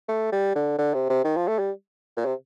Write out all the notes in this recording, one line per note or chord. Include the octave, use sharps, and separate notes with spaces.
A3
G3
D3
D3
C3
C3
D#3
F3
A3
G3
A#2
C3